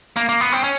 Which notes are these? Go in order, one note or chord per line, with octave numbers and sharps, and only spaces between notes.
A#3
A#3
B3
C4
C#4